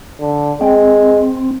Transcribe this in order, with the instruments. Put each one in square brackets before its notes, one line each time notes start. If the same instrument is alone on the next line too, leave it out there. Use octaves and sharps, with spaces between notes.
[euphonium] D3
[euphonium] G#3 [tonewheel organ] C4